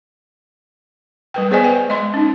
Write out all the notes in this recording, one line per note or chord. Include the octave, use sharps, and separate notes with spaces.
G3 B4 G5
B3 G#4 C5 D5 D#5 G#5
B4 G5
G#3 D#5 C6
C#4 D#4